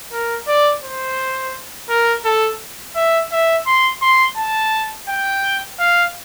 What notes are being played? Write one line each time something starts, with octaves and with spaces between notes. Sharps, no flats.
A#4
D5
C5
A#4
A4
E5
E5
C6
C6
A5
G5
F5